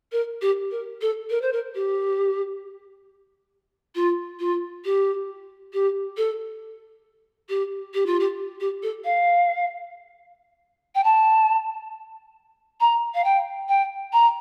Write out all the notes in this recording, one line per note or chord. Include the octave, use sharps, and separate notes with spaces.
A#4
G4
A#4
A4
A#4
C5
A#4
G4
F4
F4
G4
G4
A4
G4
G4
F4
G4
G4
A4
F5
G5
A5
A#5
F5
G5
G5
A#5